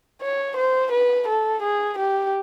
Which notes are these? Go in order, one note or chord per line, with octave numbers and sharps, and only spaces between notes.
C#5
C5
B4
A4
G#4
G4